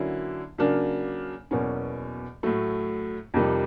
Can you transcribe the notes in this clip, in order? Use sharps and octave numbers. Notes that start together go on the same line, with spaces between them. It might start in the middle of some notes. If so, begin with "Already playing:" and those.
Already playing: D3 F#3 A#3 C#4 E4
C#3 F#3 A#3 D4
E2 B2 F#3 A#3 C#4
A2 F#3 A3
F2 C3 D#3 G3